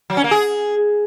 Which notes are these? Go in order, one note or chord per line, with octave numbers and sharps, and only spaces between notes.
F#3
C#4
A#3
G#4